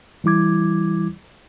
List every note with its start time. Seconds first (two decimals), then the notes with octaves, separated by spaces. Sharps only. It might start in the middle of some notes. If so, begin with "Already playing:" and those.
0.24 E3 G3 E4 D6 G#6